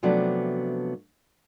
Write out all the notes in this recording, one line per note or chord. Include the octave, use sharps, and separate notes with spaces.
C3 F3 F#3 A3 B3 D4